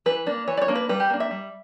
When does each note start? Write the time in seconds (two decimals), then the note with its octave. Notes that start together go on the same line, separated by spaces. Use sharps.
0.06 E3 B4
0.26 A#3 D4
0.48 E3 C#5
0.57 D5
0.62 C#5
0.68 A#3 D4
0.75 B4
0.89 G3 B4
1.00 G4
1.10 A#3 D4
1.20 E5
1.31 G3